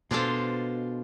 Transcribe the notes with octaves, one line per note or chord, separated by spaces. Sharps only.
B2 G#3 D4 F4 A4 C5